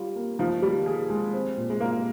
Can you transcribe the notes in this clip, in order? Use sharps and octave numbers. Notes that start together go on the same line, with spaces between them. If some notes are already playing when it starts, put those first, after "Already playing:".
Already playing: G3 C#4 F4
A#3
F3 D#4
D#3 G3
G#4
G#3
C4
A#2
G#3
A#3 F4